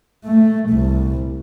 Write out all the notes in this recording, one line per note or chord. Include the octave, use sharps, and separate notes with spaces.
A3
C2